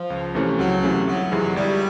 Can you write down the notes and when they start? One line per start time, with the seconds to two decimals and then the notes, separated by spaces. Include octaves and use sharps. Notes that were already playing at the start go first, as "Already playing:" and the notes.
Already playing: F3
0.10 C#2
0.35 C3 E3 A3 C#4
0.59 C#2 F#3
0.83 C3 E3 A3 C#4
1.07 G1 F#3
1.32 F2 C3 E3 G#3
1.55 G1 G3